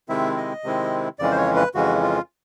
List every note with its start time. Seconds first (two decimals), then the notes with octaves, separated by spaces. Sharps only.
0.09 C3 D#3 G#3 C4 E4 E5
0.37 D#5
0.64 C3 D#3 G#3 C4 E4
1.19 F2 C#3 E3 G#3 C#4 D5
1.31 C5
1.38 C#5
1.56 B4
1.75 F2 C#3 E3 G#3 C#4 F#4
2.02 F4